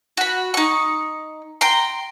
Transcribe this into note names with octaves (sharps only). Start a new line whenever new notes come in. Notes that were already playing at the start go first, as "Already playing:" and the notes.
F#4 B5
D#4 C#6
G5 A#5 C6